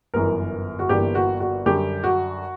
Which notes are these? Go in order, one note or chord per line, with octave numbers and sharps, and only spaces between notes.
G1 F#2 E3 A#4
F#4
G1 G2 E3 A#3 G4
F#4
F#4
F#2 D3 G3 G4
F#4